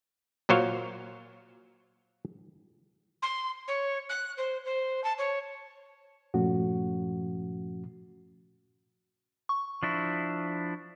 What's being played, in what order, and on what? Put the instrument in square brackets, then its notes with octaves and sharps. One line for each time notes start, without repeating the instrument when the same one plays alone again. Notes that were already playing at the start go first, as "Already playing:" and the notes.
[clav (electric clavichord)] A#2 F#3 C5 C#5 F5
[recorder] C6
C#5
F#6
C5
C5
A5
C#5
[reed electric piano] G2 A#2 F3 A3 C#4 F#4
[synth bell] C#6
[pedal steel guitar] F3 D4 E4